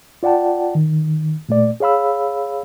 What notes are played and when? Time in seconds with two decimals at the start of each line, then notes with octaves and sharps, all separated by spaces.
0.23 F4 D5 F#5 G5 A5
0.75 D#3
1.49 A#2 A3 D5
1.80 G#4 C#5 F5 B5 E6